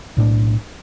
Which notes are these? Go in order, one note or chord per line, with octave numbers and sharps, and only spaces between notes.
B1 A2 D4